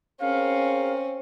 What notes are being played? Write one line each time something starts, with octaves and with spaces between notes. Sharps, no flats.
C4 C#4 G#4 A#4 F5